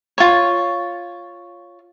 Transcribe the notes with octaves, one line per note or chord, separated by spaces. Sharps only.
F4 C#5